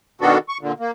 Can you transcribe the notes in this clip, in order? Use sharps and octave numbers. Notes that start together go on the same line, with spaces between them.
B2 D#3 B3 D4 F#4 A4
C#6
A#2 D3
A#3